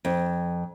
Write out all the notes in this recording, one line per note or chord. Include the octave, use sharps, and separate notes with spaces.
F2